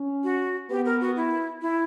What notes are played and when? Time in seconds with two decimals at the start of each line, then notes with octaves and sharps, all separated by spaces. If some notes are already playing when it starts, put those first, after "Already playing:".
Already playing: C#4
0.24 F#4
0.70 B3 G4
0.85 A#4
1.00 F#4
1.16 E4
1.62 E4